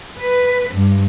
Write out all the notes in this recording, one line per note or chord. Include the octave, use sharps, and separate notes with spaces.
B4
G2